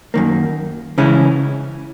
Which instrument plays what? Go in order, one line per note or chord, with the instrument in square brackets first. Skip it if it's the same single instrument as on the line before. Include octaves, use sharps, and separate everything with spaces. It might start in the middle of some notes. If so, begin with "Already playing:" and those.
[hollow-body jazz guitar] F#2 D#3 A#3
C#3 E3 G#3 C#4 E4